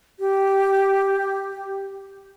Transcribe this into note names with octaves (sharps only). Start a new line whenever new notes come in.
G4